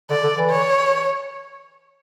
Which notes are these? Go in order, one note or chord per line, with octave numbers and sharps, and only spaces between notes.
D3 D5
D3
E3
C#5